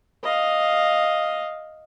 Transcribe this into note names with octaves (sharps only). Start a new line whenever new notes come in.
D#5 F5